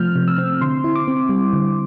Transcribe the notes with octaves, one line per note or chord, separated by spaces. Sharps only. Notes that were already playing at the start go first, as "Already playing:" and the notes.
Already playing: C3 F3 A3 C4 F6 G6
C3
E6
C4
D3 C6
E4
D6
C4
G3
D3